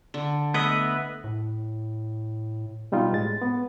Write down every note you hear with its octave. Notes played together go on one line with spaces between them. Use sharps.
D3
A3 B3 B4 D#5 E5
A2
B2 G3 D#4 F4
A2 G#3 A6
B3